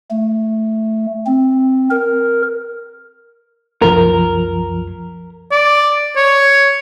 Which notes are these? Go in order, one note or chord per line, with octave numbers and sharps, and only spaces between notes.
A3
C4
A#4
C2 F#2 F3 A#4
D5
C#5